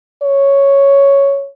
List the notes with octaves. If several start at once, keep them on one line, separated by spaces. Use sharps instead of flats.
C#5